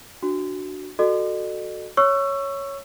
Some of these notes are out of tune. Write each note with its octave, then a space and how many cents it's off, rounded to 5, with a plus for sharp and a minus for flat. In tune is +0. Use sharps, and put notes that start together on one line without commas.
D4 +15 F#4 +0
F#4 +0 A4 +0 D#5 -45
C#5 +0 C#6 +0 E6 +25